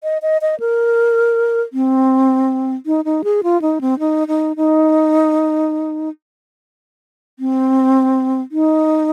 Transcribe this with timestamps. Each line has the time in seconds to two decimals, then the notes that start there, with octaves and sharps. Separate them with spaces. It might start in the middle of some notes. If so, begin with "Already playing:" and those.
0.03 D#5
0.22 D#5
0.42 D#5
0.60 A#4
1.73 C4
2.86 D#4
3.05 D#4
3.24 G#4
3.43 F4
3.62 D#4
3.81 C4
3.99 D#4
4.28 D#4
4.56 D#4
7.39 C4
8.52 D#4